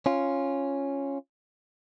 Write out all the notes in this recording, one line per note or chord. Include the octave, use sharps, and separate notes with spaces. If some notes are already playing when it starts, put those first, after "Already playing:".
C#4 F4